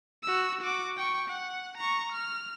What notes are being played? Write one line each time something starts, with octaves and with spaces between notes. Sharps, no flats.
F#4 E6
F#4 D6
G5 C#6
F#5
A#5 C#6
F6